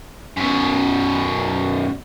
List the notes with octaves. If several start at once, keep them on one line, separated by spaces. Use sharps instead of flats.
F#2 B2